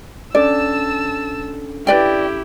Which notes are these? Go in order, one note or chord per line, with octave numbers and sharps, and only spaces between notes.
C#4 D4 A4 D5 A5 E6
E4 G4 B4 D5 G5